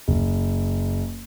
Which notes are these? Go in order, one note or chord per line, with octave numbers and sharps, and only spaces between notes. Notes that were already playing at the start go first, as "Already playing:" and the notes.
F#1